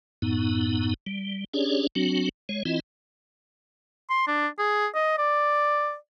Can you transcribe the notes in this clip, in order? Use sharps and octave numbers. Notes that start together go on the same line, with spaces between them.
F#2 A2 B3 D#4
G3
C#4 D4 G4 G#4 C#5 D5
F#3 C4 D4 F#4
G#3 C#5
E3 C4 E4 F4 D#5
C6
D4
G#4
D#5
D5